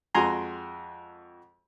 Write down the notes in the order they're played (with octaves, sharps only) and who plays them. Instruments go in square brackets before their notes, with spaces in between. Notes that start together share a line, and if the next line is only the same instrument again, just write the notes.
[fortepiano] F2 G#3 F#4 G#5 A#5 C6